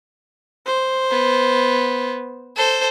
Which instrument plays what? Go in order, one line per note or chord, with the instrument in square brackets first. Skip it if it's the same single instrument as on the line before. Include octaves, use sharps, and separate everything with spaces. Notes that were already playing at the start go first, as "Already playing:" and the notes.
[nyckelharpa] C5
[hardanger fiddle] B3
A4 C5